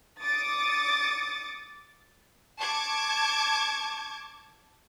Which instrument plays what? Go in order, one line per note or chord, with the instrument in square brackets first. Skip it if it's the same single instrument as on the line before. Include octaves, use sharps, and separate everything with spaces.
[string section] D6 D#6 A6 C#7
[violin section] A5 C#6 D6 G#6